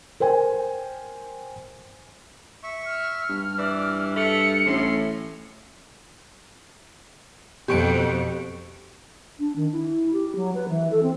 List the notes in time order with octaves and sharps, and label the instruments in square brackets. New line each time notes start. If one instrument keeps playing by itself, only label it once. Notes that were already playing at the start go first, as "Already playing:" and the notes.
[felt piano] A#4 C5 G5 G#5
[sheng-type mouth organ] E5 C#6
[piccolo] F6
[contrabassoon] G2
[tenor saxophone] E3 [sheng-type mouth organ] D5
[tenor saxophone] A3 [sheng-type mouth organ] E5 F6 [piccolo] C#7
[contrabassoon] A1 [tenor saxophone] A2 [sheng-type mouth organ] C#4 C6
[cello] F2 B2 [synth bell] G4 C#6 D7
[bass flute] D4
D#3
E4
G4
F#3
B4
E3
A4
C4